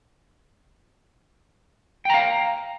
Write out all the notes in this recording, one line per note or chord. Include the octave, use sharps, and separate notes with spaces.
F5 G5 A#5